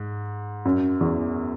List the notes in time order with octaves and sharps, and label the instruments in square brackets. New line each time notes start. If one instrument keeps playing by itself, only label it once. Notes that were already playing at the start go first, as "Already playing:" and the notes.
Already playing: [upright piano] G#2
F#2
E2